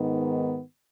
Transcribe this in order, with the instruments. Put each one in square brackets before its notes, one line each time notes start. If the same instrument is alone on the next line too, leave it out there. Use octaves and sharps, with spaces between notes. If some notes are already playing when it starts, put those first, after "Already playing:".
Already playing: [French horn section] G#2 D#3 B3